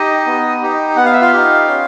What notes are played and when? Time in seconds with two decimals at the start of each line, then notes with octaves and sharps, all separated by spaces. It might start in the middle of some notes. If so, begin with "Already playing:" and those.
Already playing: D#4 G4 D#5
0.26 B3
0.62 D#4 G4
0.96 B3 F#5
1.05 F5
1.13 E5
1.21 F4 F5
1.32 D#4 G4
1.68 C#4